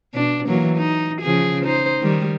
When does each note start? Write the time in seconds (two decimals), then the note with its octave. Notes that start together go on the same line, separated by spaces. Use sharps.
0.14 B2 D4
0.47 E3 F#3 A#3
0.78 D#4
1.22 C#3 F3 G#4
1.65 D#4 C5
2.01 D#3 G3